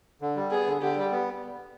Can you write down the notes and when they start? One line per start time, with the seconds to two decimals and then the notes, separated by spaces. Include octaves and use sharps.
0.21 D3
0.36 G3
0.51 B3 G#4
0.67 D3
0.82 D3 G4
0.97 G3
1.11 B3